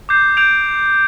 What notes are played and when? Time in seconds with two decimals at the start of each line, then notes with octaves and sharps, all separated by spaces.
0.09 D6 G6 C7
0.37 G6 D7 F7